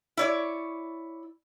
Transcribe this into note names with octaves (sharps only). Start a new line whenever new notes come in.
E4 C#5 D5